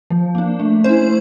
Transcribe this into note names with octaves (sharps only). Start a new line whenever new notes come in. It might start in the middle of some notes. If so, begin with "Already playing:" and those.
F3
A#3 D4
A3
C#4 E4 C5